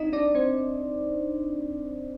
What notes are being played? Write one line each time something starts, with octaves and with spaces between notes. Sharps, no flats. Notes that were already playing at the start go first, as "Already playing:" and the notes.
Already playing: C4 D4 D#4 D#5
D4 D5
C4 C5